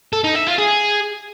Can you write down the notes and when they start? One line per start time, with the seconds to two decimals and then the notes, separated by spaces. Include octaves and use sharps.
0.13 A4
0.24 D#4
0.36 E5
0.47 F4
0.59 G#4